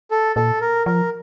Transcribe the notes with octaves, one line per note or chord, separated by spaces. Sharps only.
A4
A#2 A4
A#4
F3 A#4